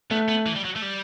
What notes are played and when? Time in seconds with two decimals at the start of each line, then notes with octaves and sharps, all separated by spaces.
0.11 A3 B3
0.29 B3
0.47 E3
0.56 G3
0.65 F#3
0.77 A3
0.83 G3